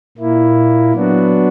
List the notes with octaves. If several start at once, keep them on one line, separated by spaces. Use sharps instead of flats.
A#2 A#3 E4
F#3 B3 D4 F#4